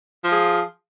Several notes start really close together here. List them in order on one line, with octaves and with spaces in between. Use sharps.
F3 F4 G#4